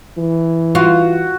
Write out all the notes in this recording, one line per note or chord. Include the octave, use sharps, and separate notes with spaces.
E3
F4 F#4